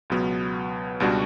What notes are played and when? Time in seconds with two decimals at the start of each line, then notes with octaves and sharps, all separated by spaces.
0.10 C#2 B2 F#3 B3
1.00 C#2 B2 G3 D4 F#4